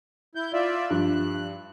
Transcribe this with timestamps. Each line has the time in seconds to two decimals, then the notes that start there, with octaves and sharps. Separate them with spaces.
0.35 E4 G6
0.53 F4 D5 E5
0.90 G2 F3 F#6